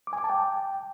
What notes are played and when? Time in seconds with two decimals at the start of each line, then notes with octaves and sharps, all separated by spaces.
0.07 D6
0.13 G#5
0.18 D6
0.24 A5
0.30 G5